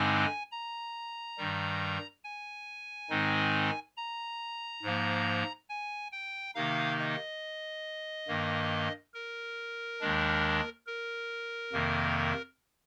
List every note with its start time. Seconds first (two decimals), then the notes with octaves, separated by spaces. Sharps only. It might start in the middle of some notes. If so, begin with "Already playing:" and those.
Already playing: G2 D3 G#3 C4 D#4 G#5
0.51 A#5
1.38 G2 D#3 G3
2.24 G#5
3.10 G#2 D#3 G#3 C4 D#4
3.97 A#5
4.83 G#2 F3 A#3
5.69 G#5
6.12 G5
6.55 C3 D#3 A#3 D#4 F5
6.98 D#5
8.28 G2 D#3 A#3
9.14 A#4
10.00 D#2 D#3 G#3 D4
10.87 A#4
11.73 F2 C3 D#3 A#3